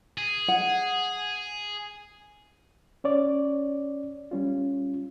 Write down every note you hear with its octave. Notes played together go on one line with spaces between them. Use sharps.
G#4
F#5
C#4 C#5 D5
G3 C#4 F4